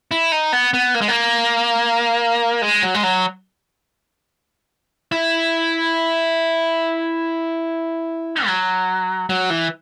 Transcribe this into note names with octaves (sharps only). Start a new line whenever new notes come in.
E4
D#4
B3
B3
A#3
G#3
A#3
G#3
F#3
G#3
F#3
E4
F#3
F#3
E3